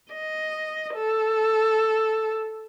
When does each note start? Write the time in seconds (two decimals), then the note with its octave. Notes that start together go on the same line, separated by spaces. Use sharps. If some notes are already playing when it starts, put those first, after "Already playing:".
0.13 D#5
0.95 A4